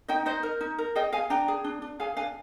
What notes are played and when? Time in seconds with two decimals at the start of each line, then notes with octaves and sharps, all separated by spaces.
0.08 D#4 D#5 G5
0.26 D#4 C5 D#5
0.43 A#4
0.61 D#4
0.78 A#4
0.95 G#4 D#5 G5
1.12 G#4 F5 G#5
1.30 D4 G5 A#5
1.48 G#4
1.64 D4
1.82 D4
2.00 G#4 F5 G#5
2.17 D4 F5 G#5